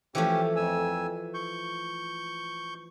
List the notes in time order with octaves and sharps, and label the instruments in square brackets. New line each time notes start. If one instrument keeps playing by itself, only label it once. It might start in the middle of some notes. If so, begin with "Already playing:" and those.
[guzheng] E3 F3 A3 [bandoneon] C#4 G4
[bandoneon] F2 G#5 E6
C#6 G6